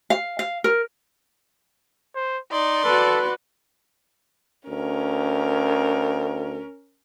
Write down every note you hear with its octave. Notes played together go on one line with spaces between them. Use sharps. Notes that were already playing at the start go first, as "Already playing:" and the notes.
F5
F5
A#4
C5
D#4 D5 C6
F#4 A4 B4
D2 C#4 A#4